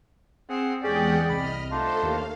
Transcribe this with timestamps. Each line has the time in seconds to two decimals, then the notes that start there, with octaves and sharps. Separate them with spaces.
0.50 C4 G#4 F#5
0.83 E2 G#3 C#4 G4 G#4 D5 F#5 G5
1.29 C2 D#5 B5 F6
1.71 A3 D4 D#4 F4 A4 C5
2.02 D#2 A#3 F5